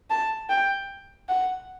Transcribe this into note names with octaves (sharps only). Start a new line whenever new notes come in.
A5
G5
F#5